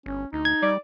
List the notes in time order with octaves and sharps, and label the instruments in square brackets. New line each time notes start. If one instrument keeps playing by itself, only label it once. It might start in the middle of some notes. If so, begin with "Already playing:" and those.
[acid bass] G1 [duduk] C#4
[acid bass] D2 [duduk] D#4
[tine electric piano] G#6
[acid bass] G3 [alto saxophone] D5